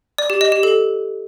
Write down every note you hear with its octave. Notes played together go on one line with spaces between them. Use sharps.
D5
G4
D#5
G4
A4